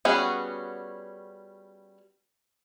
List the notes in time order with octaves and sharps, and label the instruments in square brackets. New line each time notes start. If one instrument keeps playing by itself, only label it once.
[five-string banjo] G3 B3 C#4 F#4 G#4